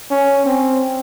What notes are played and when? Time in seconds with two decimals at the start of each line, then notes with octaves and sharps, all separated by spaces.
0.11 C#4
0.45 C4